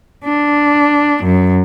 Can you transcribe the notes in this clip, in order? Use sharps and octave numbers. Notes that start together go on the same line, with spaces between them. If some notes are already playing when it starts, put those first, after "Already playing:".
D4
F#2